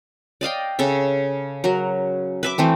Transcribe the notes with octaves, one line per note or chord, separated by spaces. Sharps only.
D5 D#5 F5 G5
C#3 A4 E5
F#3 A#4
B4 E5 D6
E3 A3 C4